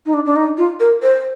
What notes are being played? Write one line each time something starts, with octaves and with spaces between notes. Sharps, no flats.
D#4
D4
D4
D#4
F4
A#4
C5